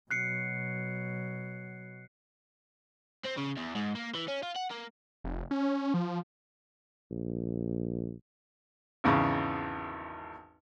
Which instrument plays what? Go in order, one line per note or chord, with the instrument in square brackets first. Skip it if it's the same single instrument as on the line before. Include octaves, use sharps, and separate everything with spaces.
[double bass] B2 F#3 [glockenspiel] F#6 C7 C#7
[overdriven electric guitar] C4
C#3
E2
G#2
A#3
E3
C#4
F4
F#5
A#3
[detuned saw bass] F1
C#4
F3
[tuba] A#1
[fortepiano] G#1 E2 C#3